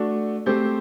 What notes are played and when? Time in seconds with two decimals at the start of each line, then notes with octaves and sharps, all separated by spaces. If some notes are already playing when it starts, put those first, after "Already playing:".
Already playing: A3 D4 F#4
0.46 A3 C4 G4 C5